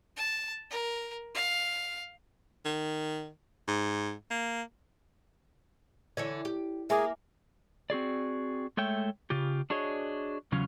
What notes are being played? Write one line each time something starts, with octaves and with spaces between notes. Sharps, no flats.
A5
A#4
F5
D#3
G#2
A#3
D3 E3 C#5 D5
G4
A#3 G#4 E5 G#5 D6
C4 F#4 G#4 D5
G#3 A3 C#5 E5 G5
C#3 F4 G4
D4 F#4 G#4 C#5 D#5
E2 C#3 F#3 C#4 F4